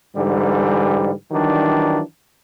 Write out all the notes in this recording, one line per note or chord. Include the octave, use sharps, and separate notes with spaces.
G#2 D3 E3 G3
D#3 E3 F#3 G3 D4